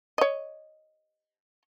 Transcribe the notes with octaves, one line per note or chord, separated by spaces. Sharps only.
C#5 D#5